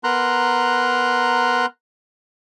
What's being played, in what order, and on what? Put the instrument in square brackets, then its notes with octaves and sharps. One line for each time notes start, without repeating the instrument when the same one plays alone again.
[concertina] B3 A#4 A#5 C6 F#6